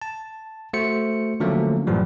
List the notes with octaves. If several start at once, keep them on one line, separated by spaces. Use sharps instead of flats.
A5
A3 F#4 C5 C#7
D3 F3 F#3 A3 A#3 C#4
F#2 A2 E3 F3 G3